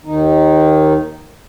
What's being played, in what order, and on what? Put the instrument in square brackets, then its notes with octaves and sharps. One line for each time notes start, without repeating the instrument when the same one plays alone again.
[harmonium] D#2 D#3 D#4